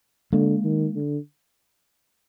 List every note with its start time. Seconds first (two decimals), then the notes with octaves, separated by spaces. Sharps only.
0.33 D3 G#3 A#3
0.65 D#3
0.96 D3